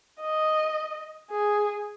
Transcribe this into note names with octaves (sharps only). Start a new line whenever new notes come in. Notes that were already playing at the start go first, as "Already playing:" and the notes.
D#5
G#4